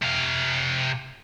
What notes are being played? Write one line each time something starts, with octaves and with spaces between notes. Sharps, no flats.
C3 F5